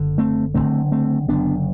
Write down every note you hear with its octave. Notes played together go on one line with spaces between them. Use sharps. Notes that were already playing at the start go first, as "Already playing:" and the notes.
Already playing: F#1 D3
A3 C4
F#1 F#2 D3 A3 C4
A3 C4
F#1 F#2 D3 B3 D4